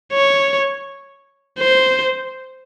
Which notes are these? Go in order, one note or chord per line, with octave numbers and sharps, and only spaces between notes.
C#5
C5